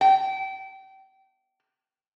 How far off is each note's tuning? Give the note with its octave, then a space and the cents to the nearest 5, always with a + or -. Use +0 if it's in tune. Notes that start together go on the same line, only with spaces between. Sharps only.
G5 -30